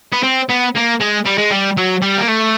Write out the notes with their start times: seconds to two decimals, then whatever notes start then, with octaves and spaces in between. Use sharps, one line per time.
0.12 B3
0.23 C4
0.49 B3
0.75 A#3
1.00 G#3
1.25 G3
1.38 G#3
1.51 G3
1.77 F#3
2.02 G3
2.19 A#3
2.29 A3